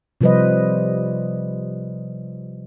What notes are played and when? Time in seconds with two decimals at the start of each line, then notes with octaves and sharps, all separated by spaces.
0.21 C3 F3 G3 B4 C5 D#5